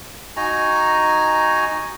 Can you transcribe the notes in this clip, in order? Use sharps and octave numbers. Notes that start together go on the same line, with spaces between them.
D#4 F#4 G#5 A#5